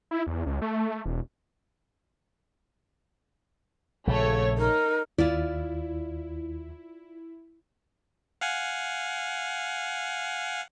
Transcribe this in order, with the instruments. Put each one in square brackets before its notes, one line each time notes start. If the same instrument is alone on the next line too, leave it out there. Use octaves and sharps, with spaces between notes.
[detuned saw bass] E4
E2
C#2
A3
E1
[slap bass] A#1 C#3 [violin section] A3 C#5
[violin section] D#4 [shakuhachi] A#4
[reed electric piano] D#2 [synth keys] E4 [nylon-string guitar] F4 D5
[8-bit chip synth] F5 F#5 G#5